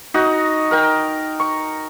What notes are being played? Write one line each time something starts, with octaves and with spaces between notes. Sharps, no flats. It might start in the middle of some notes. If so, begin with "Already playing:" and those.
D#4 F#4 D#5
A#4 G5
C#6